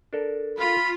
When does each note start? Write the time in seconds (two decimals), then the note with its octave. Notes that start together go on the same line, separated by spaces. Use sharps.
0.13 D4 A4 A#4
0.59 F4 B5